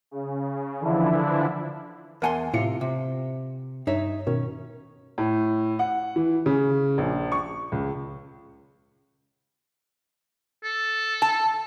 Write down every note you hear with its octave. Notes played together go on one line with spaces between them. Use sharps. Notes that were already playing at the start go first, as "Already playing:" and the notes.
C#3
D3 E3 F3 D4 E4
E2 A#4 F#5 G#5 A5 C6
A2 C3 F4 C#7
C3
G2 D#4 C#5 E5
B2 D#3 C#4
A2
F#5
E3
C#3
A#1
C#6
C#2
A4
A5